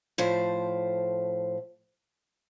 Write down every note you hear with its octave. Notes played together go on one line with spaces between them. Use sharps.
A2 F3 A3 C5